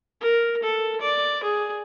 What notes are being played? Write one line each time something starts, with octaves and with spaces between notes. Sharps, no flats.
A#4
A4
D5
G#4